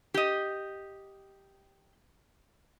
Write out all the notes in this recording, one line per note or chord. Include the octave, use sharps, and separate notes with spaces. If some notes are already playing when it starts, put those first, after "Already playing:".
G4 D#5